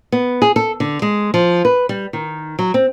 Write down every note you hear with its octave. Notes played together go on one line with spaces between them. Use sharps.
B3
G#4
A4
D3
G#3
F3
B4
G3
D#3
F#3
C4